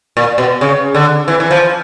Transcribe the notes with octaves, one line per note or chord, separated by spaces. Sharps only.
A#2
B2
C#3
D3
E3
E3
F3